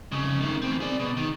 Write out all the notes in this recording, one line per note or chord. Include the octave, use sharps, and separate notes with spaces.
F2 C#3
A2 D#3
E2 C4
G#4 D5
B2
D#3